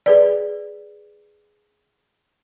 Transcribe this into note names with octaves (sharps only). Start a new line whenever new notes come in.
G#4 B4 D5